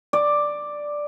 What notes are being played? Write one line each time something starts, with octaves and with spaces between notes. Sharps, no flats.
D5